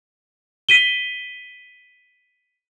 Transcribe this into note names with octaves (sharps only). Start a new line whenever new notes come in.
B6 D#7 G7